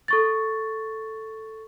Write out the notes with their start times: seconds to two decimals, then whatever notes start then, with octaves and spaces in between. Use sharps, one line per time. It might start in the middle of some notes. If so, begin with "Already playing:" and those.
0.08 A4 C#6 A6